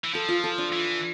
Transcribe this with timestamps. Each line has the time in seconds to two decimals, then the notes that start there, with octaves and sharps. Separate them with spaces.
0.04 E3
0.14 F3 A4
0.29 F4
0.44 A4
0.58 D4
0.73 E3